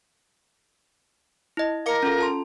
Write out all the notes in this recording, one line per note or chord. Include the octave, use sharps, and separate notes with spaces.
E4 D#5
A#4 F5 D6 C#7
C#4 F4 A4
F4 A5 C6